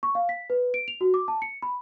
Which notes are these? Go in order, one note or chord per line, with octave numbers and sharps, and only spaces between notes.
C#6
F5
B6
B4
D7
F7
F#4
D6
A5
C#7
B5